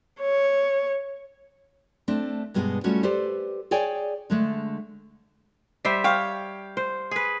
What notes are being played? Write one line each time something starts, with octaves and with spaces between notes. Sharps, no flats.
C#5
A3 C4 D4
G2 B2 G#3 A3 B3 D4
G3 A3 C#4 F4 F#4
G4 A4 B4 C5 D5
G#4 C#5 D5 G5 G#5
D3 G#3 A3
G3 C5 E5
C#5 F5 G5
C5
G#4 B4